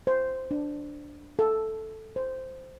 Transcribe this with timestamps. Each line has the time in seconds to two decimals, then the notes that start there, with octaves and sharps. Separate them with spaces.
0.07 C5
0.51 D4
1.39 A4
2.16 C5